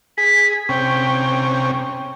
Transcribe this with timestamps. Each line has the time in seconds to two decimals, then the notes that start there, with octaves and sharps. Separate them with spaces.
0.18 G#4 B6
0.69 C3 C#4 G5